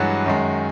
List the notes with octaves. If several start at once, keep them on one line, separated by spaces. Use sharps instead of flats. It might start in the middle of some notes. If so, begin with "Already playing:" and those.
Already playing: G2 E3 F#3 G#3 F#4
F#2 D#3 G#3